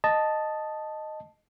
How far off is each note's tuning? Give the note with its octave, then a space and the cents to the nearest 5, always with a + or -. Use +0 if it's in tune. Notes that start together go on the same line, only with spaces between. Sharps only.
D#5 -5 A5 +0